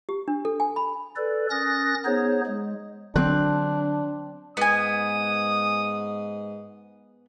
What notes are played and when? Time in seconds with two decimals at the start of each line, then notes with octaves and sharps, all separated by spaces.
0.09 G4
0.28 D4
0.45 A4
0.60 G#5
0.76 B5
1.16 A4 B4 D5
1.50 C#4 A#4 D#6 F#6 A6 A#6
2.05 B3 D#4 G#4 C5 C#5
2.46 G#3
3.16 D3 F#3 C4 D4 F#6
4.57 G#2 B3 G#5 D#6